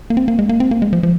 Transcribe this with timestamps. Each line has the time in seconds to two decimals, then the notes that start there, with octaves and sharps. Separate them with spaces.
0.10 A#3
0.17 C4
0.28 A#3
0.39 G#3
0.49 A#3
0.60 C4
0.71 A#3
0.82 G#3
0.93 F3
1.03 F3